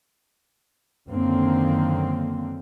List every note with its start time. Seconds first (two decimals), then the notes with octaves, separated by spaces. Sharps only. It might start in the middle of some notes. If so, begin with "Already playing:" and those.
1.08 F#2 D3 D#3 A#3 C4